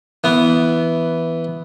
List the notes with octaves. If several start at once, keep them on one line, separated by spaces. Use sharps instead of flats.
E3 B3